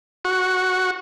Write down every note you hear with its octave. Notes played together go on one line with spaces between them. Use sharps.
F#4